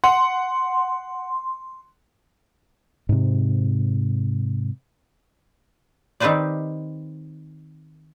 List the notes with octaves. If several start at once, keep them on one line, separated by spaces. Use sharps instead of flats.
F#5 C6
G#2 C3
D#3 C4 G4 B4 C5 D5